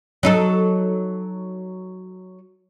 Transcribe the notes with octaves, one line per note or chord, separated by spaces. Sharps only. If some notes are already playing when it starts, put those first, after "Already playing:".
F#3 D#4 A4